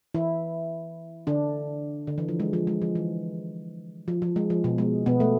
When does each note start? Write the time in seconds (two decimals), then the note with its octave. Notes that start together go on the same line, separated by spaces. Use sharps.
0.14 E3 E4
1.27 D3 D4
2.07 D3
2.18 E3
2.28 F3
2.40 G#3
2.53 F3
2.67 G#3
2.82 F3
2.95 E3
4.08 F3
4.22 F3
4.36 G#3
4.50 F3
4.64 B2
4.78 G#3
5.06 B2 B3
5.20 A3